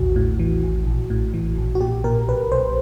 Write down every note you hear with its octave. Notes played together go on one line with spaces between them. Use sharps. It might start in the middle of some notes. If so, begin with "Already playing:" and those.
Already playing: A1 D#2 F#4
A2
E3
A1
A#1
A2
E3
A#1
F#4
A#2 G4
A#2 A#4
B1 B4
B1 C5